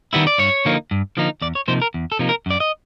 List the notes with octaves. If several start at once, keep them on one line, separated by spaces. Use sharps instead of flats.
D#3 G3 B3 E4
D5
G2 C#5
D3 F3 A#3 D#4
G2
D3 F3 A#3 D#4
E2 D5
C#5
C3 F3 A#3 D#4 C5
A#4
E2
A4
C3 F3 A#3 D#4
A#4
F#2 D5
D#5